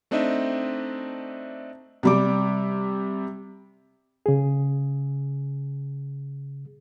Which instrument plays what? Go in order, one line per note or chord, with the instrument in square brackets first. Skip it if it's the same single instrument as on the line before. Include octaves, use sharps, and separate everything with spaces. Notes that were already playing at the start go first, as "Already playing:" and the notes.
[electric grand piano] A3 C4 D4 D#4 D#5 E5
[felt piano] C3 G3 D6
[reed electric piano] C#3 G#4